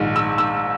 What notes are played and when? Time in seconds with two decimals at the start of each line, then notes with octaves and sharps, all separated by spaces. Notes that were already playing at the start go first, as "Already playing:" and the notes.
Already playing: A#1 G#2 D#3
0.16 E6
0.38 E6